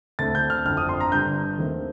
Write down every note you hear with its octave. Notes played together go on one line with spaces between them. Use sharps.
D2 D3 A3 C4 A6
G6
F6
G1 F2 D3 F6
D#6
C6
A#5
G1 G2 D3 G6
D#2 D#3 A3 C4